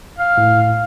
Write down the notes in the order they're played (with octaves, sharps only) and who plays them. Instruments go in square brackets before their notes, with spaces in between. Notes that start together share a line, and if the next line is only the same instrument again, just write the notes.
[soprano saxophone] F5
[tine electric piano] A2